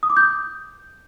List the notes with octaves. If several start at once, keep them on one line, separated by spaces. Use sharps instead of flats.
D#6
D6
G6